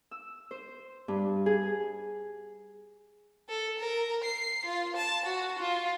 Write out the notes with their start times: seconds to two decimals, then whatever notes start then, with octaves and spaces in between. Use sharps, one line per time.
0.11 E6
0.51 C5
1.08 G2
1.46 G#4
3.49 A4
3.79 A#4
4.24 C7
4.65 F4
4.96 A5
5.26 F#4
5.59 F4